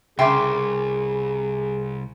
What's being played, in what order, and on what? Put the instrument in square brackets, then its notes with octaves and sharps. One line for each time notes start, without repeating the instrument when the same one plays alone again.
[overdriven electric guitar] C2 [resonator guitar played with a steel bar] C#3 E5 G5 [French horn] G#4 [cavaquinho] C6 D6